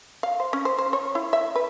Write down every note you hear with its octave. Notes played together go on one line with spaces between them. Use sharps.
F5
C5
C#4
C5
C5
C#5
E4
E5
B4